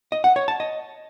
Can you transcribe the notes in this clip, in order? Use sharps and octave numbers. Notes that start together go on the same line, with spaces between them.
D#5
F#5
C#5
A5
D#5